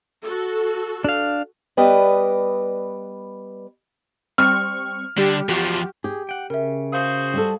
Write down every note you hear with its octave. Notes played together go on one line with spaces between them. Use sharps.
F#4 A4
D4 F5
G3 B3 B4 D5 D#5
G3 C4 C#6 F6
D3 G3 G4
E2 F3 F#4 G4
G4 G#4
F#5 G5
C#3 A#4 E5
F#4 G#4 C5 F5
G3 A4